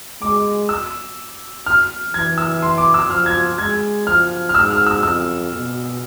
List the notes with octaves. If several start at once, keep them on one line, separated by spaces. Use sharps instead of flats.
G#3 D6
E6
F6
E3 G#6
E6
C6
D6
E6
F3 F6
G#6
G#3 G#6
F3 F6
F6
G#2 E6
F6
E6
F2 E6
B2